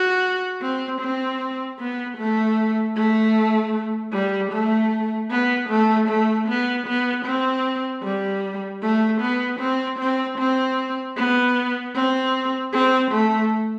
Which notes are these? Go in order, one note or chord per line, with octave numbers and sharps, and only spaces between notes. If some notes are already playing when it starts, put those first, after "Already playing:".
Already playing: F#4
C4
C4
B3
A3
A3
G3
A3
B3
A3
A3
B3
B3
C4
G3
A3
B3
C4
C4
C4
B3
C4
C4
A3